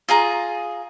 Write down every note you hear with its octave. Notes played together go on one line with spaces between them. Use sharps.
F4 G#4 A#5